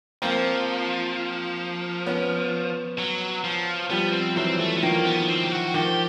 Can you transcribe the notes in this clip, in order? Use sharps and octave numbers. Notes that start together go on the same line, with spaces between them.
F3 A#3 C4
B3 C#4
F#3
F3
F3 G3 B3
C4
E3 F#3 C4
A3
B3
D#3 F3 A#3
B3
C4
G4
F#4
D#3 F3 G4